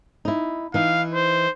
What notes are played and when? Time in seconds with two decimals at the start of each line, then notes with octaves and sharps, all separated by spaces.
0.25 D#4 E4
0.74 E3 D#4 F5
1.14 C5